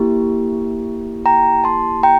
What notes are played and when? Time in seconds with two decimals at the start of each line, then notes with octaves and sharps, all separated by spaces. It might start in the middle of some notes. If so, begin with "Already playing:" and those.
Already playing: A#3 E4 G4
1.26 G5 A#5
1.64 A5 C6
2.03 G5 A#5